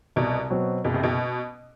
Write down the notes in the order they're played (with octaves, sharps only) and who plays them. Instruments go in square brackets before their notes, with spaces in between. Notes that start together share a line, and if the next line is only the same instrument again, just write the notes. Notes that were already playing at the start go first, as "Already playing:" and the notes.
[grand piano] C2 [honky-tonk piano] B2
[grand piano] B2 F#3 C4
[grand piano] F#1 [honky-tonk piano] B2
[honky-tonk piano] C3
B2